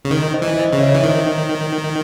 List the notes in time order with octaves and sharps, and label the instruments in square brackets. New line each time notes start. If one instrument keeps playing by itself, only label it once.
[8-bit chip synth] C#3
D#3
[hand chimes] C5 D#5
[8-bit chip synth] E3
[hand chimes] C5 D#5
[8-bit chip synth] C#3
[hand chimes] C#5 E5
[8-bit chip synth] E3
[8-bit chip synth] D#3 [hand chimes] C5 D#5